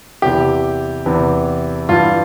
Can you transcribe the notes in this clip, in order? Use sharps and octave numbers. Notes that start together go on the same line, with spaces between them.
E2 C3 E3 G4
E2 C3 E3
G2 E3 F4